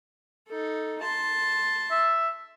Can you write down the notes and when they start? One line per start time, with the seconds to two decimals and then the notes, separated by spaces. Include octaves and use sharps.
0.49 D#4 A4
1.01 A5 C6
1.91 E5